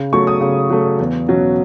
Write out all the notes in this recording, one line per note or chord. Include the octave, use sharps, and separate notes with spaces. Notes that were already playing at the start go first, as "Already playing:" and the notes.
Already playing: C#3
F#3 A3 C#6
D#6
C#3
F#3 A3
E2
B2 F#3 C#4